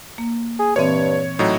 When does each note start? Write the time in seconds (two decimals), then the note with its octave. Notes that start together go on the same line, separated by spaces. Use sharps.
0.18 A#3
0.59 G#4
0.76 G2 A#2 E3 C4 C#5
1.39 A2 F#3 D#4